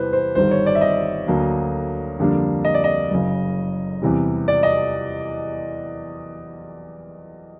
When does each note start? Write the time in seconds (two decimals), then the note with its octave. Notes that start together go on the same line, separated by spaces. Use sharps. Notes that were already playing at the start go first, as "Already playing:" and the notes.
Already playing: E2 C3 E3 G3 B4 C5
0.13 C5
0.35 G1 G2 D#3 G3 C5
0.51 C#5
0.66 D5
0.75 E5
0.81 D#5
1.27 D2 D3 F#3 A#3 D4
2.19 F2 D3 G3 A#3 D4
2.65 D#5
2.74 D5
2.84 D#5
3.10 F#1 F#2 C#3
4.02 E2 C3 E3 G3
4.48 D5
4.63 D#5